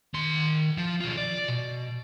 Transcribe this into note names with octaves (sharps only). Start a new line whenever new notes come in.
D#3 C6
F3
B1 F4
D5
B2